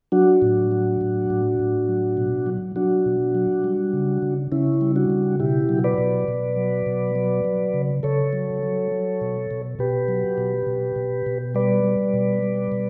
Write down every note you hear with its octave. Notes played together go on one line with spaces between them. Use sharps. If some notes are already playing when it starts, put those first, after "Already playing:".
F#3 D4 F#4
A2
F#3
A2
A2
A2
F#3
B2
F#3
F#3 D4 F#4
B2
F#3
G3
C#3
C#3
C#3 C#4 E4
G3
D4 F#4
C#3
B2 E4 G4
F#3
B4 D5
B2
B2
F#3
B2
F#3
F#3
C#3
C#3 A4 C#5
F#3
F#3
F#3
B2
B2
B2 G4 B4
F#3
B2
B2
B2
B2
G3 B4 D5
G3
B2
G3
B2